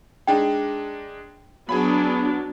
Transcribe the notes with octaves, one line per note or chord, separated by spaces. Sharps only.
G#3 D4 D#4 G5
F#3 B3 D4 G#4 G#5 B5